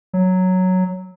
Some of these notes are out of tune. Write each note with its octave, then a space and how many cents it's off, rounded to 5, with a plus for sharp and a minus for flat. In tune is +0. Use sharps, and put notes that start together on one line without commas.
F#3 +0